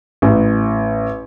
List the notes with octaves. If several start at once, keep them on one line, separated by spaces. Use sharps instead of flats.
A1